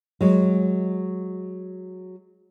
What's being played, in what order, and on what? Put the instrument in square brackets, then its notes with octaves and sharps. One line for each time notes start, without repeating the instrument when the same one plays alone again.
[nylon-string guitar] F#3 G#3